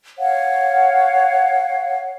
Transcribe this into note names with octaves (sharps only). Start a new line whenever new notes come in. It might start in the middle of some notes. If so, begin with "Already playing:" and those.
C#5 F5 F#5